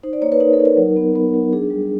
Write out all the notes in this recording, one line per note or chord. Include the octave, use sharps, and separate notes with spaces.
D#4 C5
D5
A#3 C#5
B4
D#4 A#4
A4
D#4
A#4
F#3
B3
B3
F#3
D4 G#4
G3